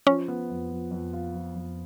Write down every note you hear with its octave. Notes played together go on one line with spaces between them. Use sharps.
F3 C#4
B3
F2
F3
F2
F4
F3
F2